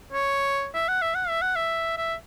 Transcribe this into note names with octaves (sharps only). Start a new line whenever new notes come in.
C#5
E5
F#5
E5
F#5
E5
F#5
E5
E5